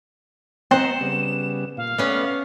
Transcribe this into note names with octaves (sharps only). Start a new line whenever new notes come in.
C4 C5 D#5 F#5 A#5 E7
C#3 G3 B3
A#2 F5
A3 B3 C#4 B4 D5